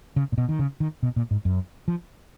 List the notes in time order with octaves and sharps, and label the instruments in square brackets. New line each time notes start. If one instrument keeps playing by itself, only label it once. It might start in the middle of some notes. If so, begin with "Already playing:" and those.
[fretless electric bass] C#3
A#2
B2
D#3
C#3
D#3
B2
A#2
G#2
F#2
F3